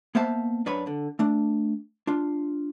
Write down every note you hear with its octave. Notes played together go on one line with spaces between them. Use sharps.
A#3 B3 C5 E5 F5 A5
F#2 D4 B4 C#5 B5
D3
A3 D4
D4 F4